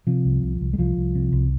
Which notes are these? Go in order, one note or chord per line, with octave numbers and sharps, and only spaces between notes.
C3 F3
C2
C2
C2
G#3
C2 F3
C2
C3
C2